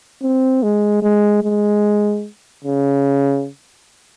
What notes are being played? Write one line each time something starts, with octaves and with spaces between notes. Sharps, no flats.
C4
G#3
G#3
G#3
C#3